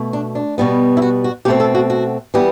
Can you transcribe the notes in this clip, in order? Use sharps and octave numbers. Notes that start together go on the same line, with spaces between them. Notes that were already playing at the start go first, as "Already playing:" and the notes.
Already playing: B2 A3
D4
D4
B2 G3 B3
E4
F#4
F#4
B2 A3 C4 G4
A4
F#4
F#4
E3 G3 B3 G4